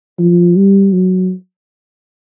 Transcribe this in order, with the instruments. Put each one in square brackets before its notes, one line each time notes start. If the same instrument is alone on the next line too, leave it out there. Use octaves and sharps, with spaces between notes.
[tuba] F3
G3
F#3